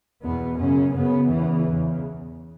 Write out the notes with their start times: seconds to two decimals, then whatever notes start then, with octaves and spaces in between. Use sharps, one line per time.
0.23 E2 B2 B3
0.58 F#2 C#3 C#4
0.94 F#2 C#3 B3
1.29 E2 C#3 E3
1.66 E2 C#3